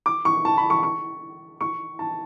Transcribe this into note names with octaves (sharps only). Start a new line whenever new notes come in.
D6
C#6
A5
B5
C#6
C#6
C#6
A5